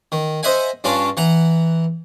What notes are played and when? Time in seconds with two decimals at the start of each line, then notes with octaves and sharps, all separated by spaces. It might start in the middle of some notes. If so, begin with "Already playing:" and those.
0.12 D#3
0.43 C5 D#5 E5 F#5 G#5
0.84 G2 C#4 D4 F4 A5 D6
1.17 E3 F#5 A#5